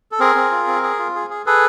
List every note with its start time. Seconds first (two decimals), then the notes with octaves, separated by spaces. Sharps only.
0.12 A4
0.20 C4 G#4 A#4
0.36 C4
0.51 F4
0.67 C4
0.83 G#4
0.99 F4
1.15 G#4
1.30 G#4
1.46 G#4 A4 B4